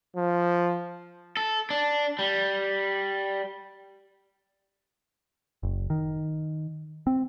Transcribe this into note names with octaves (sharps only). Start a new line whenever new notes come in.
F3
A4
D4
G3
F#1
D#3
C4